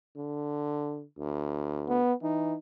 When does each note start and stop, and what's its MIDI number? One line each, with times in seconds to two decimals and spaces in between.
0.17 1.03 50
1.18 2.02 38
1.89 2.14 59
2.22 2.55 52
2.22 2.57 63